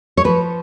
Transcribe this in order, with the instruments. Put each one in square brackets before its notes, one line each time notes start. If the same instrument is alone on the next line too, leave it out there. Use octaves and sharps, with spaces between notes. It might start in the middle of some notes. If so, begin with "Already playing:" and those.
[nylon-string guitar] C#5
F3 B4